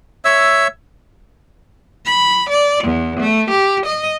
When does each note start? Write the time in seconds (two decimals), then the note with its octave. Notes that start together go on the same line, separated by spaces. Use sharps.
0.25 C#5 E5 E6
2.05 B5
2.49 D5
2.84 E2
3.19 A3
3.50 G4
3.85 D#5